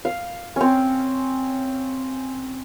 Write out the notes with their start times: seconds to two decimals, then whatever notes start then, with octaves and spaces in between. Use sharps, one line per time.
0.05 F5
0.56 C4 C#4